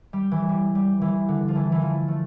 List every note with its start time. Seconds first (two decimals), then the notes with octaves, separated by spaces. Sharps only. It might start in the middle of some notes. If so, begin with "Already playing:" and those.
0.13 G3
0.32 E3
0.49 G3
0.75 G3
1.02 E3
1.28 D3
1.48 F3
1.55 E3
1.72 E3
1.82 F3
2.08 A3